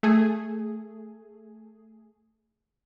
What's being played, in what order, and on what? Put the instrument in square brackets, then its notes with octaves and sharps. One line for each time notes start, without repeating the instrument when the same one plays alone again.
[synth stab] A3 G#4